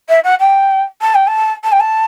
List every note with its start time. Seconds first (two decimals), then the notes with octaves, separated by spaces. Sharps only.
0.09 E5
0.24 F#5
0.40 G5
1.01 A5
1.15 G5
1.27 A5
1.64 A5
1.72 G5
1.80 A5